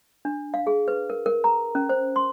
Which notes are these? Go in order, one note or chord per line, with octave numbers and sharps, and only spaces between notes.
D4
F5
G#4
B4
A#4
A#4
A#5
C#4
C5
C6